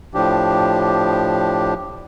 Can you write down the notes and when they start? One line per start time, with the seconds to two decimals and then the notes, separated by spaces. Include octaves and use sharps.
0.14 A2 F3 D4 G4